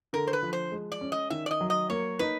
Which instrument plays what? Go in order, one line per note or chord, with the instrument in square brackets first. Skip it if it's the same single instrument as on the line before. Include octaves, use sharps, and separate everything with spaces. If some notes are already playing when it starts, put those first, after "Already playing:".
[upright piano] D3 [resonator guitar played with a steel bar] A#4
[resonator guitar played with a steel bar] C5
B4
[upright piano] F3
[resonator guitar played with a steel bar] C5
[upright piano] G#3
[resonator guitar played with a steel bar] D5
[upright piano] C#4
[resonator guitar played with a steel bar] D#5
[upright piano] D#3 [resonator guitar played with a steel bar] E5
[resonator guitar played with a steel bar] D5
D#5
[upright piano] F#3
[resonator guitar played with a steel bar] D#5
[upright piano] A#3 [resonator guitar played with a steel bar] C#5
[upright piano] D#4 [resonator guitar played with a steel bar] B4